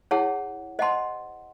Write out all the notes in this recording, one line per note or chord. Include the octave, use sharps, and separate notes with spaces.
E4 G#4 C#5 F#5 A5
C5 D#5 F#5 A5 C6